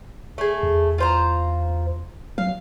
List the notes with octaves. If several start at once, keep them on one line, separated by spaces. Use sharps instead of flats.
A3 G#4
E2
F4 C5 A#5
F#3 F5